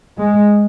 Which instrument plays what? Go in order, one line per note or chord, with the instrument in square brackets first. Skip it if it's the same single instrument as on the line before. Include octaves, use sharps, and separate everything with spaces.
[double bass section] G#3